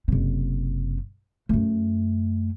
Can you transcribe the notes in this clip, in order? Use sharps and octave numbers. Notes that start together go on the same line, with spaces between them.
F#1 C3
F#2 A3